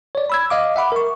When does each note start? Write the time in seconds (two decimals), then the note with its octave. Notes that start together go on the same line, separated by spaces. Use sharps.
0.15 C#5 D5
0.30 B5 E6 G#6
0.50 D#5 F5 D6
0.76 E5 F#5 B5 D6
0.92 A#4 C#6